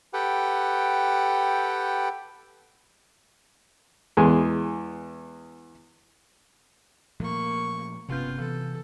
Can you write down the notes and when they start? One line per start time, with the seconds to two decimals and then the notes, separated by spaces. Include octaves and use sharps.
0.13 G4 A4 B4 F#5 G5
4.17 E2 G#3 G#5
7.20 A#2 F3 A3 A#3 C#6
8.09 G1 C3 B3 C#4 F4 G6
8.40 E3 A4